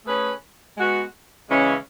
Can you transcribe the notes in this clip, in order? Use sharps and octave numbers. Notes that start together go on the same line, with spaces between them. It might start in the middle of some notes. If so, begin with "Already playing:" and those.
A3 C#4 G#4 B4
G#3 B3 F#4
C#3 E3 G#3 C#4